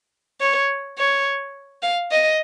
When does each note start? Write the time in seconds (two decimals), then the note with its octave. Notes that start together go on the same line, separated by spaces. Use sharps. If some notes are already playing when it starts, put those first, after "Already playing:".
0.41 C#5
0.98 C#5
1.82 F5
2.11 D#5